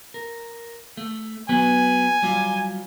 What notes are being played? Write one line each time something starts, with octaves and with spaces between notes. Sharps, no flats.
A#4
A3
F#3 B3 B4 G#5
F#3 G3 F4